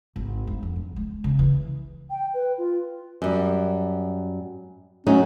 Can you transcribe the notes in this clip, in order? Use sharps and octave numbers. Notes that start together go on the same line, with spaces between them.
G#1
G2
F2
G2
G#3
C#3
E3
G5
B4
F4
F#2 G3
F#3 A3 C#4 D#4